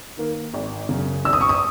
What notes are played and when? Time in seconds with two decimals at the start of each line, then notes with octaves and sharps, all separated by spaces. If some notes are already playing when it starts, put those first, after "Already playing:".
0.17 D#3 A#3
0.54 G#1
0.89 F#2 C#3
1.25 G#1 E6
1.33 D#6
1.41 C#6
1.49 D#6